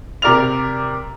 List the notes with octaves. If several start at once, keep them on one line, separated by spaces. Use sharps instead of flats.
C3 G4 A#4 D5 F6 F7